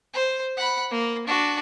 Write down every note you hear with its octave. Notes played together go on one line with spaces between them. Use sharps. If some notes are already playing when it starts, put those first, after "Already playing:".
C5
F#5 B5
A#3
D4 F#4